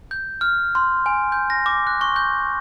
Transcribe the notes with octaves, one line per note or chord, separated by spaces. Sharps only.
G6
F6
C6
G#5
G6
A#6
D6
F#6
C#6
G6